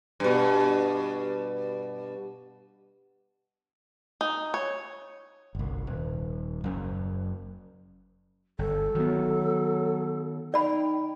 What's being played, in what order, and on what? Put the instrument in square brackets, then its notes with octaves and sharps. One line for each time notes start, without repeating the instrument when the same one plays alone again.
[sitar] G2 B2
[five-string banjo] D#4
C#5
[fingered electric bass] G1 C2
D#1
F#1 F#2
[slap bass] G1 [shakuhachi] A4
[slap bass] D#3 B3 [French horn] F#3
[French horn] D#4 [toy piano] D5 B5 [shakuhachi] G5